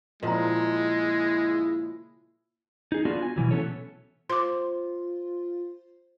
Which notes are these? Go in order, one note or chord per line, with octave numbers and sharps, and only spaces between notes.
A#2 C#3 F3 G#3 E4 D#5 A#5
D#4 G#4
B3 D4 F4 F#4
G#5
B2 D#3 E3 F#3
A3 B3 C#4 A4 C#5
F4 C5 C6 D6